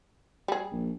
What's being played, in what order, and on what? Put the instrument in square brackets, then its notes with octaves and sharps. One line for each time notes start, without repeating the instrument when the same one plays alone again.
[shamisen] G3 G#4
[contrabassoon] A#1